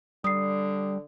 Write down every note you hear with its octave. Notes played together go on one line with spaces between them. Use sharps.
D3 G3 D#6 C7